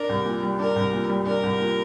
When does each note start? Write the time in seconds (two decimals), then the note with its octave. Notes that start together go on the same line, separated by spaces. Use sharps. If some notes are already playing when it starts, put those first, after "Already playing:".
Already playing: D4 A#4
0.09 C2
0.26 A#2
0.43 G3
0.59 D4 A#4
0.76 C2
0.93 A#2
1.09 G3
1.26 D4 A#4
1.43 C2
1.60 A#2